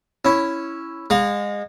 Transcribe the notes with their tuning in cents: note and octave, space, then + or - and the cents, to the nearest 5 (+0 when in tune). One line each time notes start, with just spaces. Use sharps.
C#4 +0 E4 +0
G#3 -25 F5 +35 A#5 +30